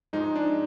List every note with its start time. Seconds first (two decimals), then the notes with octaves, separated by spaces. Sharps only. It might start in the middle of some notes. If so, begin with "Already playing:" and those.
0.13 G#2 F3 G#3 D#4
0.36 D4